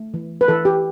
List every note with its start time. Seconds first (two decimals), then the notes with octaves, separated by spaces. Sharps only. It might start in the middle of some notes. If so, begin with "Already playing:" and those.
Already playing: A3
0.14 E3
0.41 B4
0.48 E3 A4
0.65 G4